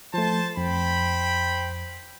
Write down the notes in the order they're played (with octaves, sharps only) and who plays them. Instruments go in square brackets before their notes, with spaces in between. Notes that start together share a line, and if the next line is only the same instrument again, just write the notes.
[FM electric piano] F3 A3 [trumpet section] C5 A5
[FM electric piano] F2 [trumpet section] C5 G5 B5